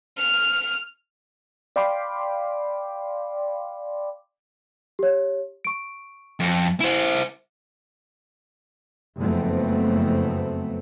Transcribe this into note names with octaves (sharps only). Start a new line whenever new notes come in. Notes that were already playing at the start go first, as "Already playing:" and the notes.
F6
D5 F5 G5 B5 C6 D6
G4 C#5
C#6 D7
F2
E4 C5
F#1 F2 F#3 A3 B3 C4